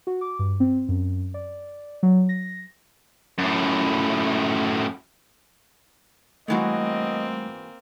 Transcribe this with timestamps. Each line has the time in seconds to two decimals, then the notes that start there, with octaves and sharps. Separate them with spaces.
0.07 F#4
0.21 D6
0.39 G2
0.60 C4
0.89 F#2
1.34 D5
2.03 F#3
2.29 A#6
3.38 F#2 A2
6.48 G#2 E3 G3 A3 A#3 C4 F#4 D#5